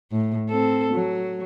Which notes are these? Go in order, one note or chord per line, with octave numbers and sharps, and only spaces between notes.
A2
C4 A4
F#3